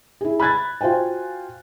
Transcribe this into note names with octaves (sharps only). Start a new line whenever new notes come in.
E4 G#4
B5 F#6 G#6 A6
F4 F#4 C5 G5 G#5